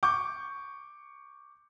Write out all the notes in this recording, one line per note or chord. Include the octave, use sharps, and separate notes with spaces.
C#6 D6 G6